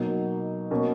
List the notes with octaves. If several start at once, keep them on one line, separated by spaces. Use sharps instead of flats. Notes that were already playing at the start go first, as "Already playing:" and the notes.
Already playing: B2 F#3 A#3 D#4
B2 A#3 C#4